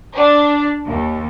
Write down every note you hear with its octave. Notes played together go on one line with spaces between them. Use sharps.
D4
D#2